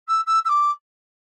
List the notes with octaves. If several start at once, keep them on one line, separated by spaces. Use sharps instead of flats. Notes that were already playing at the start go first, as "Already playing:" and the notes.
E6
E6
E6
D6